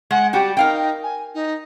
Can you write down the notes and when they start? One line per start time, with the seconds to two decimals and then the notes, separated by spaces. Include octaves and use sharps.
0.11 G#3 F#5
0.33 G3 F#4 G4 G5
0.57 D#4 A#4 F5 G5
1.03 G#5
1.34 D#4